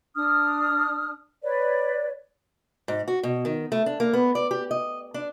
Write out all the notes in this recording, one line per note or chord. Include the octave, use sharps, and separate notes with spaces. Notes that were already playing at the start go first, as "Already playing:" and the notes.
D4 D#6 F6
B4 C#5 D5
G#2
F#4
B2
D#3
A3
D4
A#3
B3
D5
G4
D#5
D4